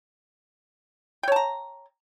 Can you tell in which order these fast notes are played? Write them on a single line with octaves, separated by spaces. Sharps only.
G5 C#5 A5 A#5